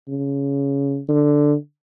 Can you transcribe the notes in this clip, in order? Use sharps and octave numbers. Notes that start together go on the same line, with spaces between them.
C#3
D3